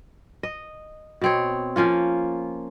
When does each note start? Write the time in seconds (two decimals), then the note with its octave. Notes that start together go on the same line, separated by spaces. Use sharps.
0.43 D#5
1.21 B2 C4 C#5
1.76 F3 A#3 C#4 F4